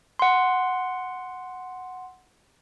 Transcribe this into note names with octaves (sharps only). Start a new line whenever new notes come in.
F#5 C6